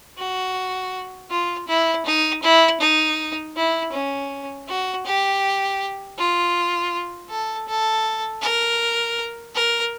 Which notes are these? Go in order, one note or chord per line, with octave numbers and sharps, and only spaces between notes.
F#4
F4
E4
D#4
E4
D#4
E4
C#4
F#4
G4
F4
A4
A4
A#4
A#4